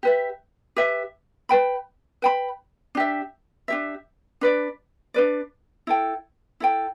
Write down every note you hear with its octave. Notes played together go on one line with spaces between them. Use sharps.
G4 B4 E5
G4 B4 E5
B4 G5 B5
B4 G5 B5
D4 G4 E5
D4 G4 E5
D4 B4 D5
D4 B4 D5
E4 A4 G5
E4 A4 G5